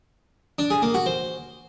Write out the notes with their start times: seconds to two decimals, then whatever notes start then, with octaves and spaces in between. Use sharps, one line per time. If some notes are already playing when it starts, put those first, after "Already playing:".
0.59 D4
0.70 G#4
0.82 A#3
0.94 F#4
1.06 C5